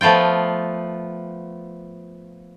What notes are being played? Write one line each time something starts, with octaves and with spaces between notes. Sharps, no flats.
F3 A3 B3 F4 G5